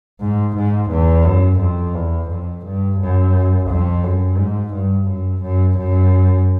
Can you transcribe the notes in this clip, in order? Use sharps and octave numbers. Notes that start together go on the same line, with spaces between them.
G#2
G#2
E2
F#2
F2
E2
F2
G2
F#2
F2
F#2
G#2
G2
F#2
F#2
F#2